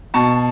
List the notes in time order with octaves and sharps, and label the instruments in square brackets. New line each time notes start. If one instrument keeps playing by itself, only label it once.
[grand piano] B2 A5 C#6